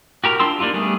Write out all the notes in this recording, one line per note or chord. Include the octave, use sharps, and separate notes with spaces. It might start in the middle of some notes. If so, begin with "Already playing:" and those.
F#4 G4 A#4
D4 F4 C6 E6
A#3 D4 D#4 F4 G4
G3 A3 B3 G#4